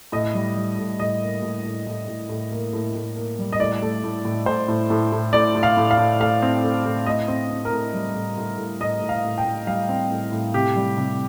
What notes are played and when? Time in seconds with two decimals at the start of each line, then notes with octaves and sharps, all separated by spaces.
0.12 A2 D#5
0.34 G3
0.55 G3
0.78 A2
0.99 A2 D#5
1.22 A#3
1.42 A2
1.64 A2
1.87 A2
2.08 A2
2.29 A2
2.52 A#3
2.73 A2
2.95 A2
3.16 A#3
3.39 G3
3.53 D#5
3.60 A2 D5
3.82 A3
4.04 A2
4.25 A2
4.46 A2 C5
4.68 A2
4.90 A2
5.12 A2
5.33 A2 D5
5.55 A2
5.63 F5
5.77 A2
5.91 F5
5.98 A2
6.20 A3 F5
6.42 C4
6.64 A3
6.85 A2
7.06 A2 D#5
7.28 C4
7.51 C4
7.65 A#4
7.73 A2
7.93 G3
8.15 A2
8.38 A2
8.58 A2
8.80 A2 D#5
9.02 A2
9.09 F5
9.24 A2
9.38 G5
9.45 A2
9.67 G3 F5
9.89 C4
10.11 A2
10.32 A2
10.54 C3 G4
10.76 G3
10.97 C3